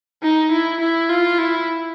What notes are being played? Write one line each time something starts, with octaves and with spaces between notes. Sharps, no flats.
D#4
E4
E4
F4
E4